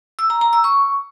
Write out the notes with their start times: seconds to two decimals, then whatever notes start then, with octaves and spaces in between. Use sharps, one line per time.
0.19 E6
0.30 A#5
0.41 A#5
0.53 E6
0.64 C#6